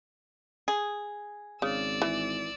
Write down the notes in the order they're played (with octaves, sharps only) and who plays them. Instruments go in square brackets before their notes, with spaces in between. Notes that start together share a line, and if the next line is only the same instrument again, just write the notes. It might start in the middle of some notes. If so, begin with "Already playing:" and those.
[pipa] G#4
[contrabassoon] G#1 [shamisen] C#3 [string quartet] D5 E6
[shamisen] E3